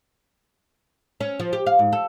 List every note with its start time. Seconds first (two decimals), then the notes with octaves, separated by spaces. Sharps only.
1.20 C#4
1.39 F3
1.53 G4
1.66 F5
1.79 G#2
1.92 A4